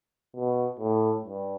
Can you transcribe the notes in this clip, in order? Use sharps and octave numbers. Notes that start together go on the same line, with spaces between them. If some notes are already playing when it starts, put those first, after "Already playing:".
B2
A2
G2